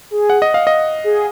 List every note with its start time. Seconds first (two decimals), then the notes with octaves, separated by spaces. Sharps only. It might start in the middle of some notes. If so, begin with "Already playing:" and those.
0.11 G#4
0.30 F#5
0.42 D#5
0.54 F5
0.67 D#5
1.04 G#4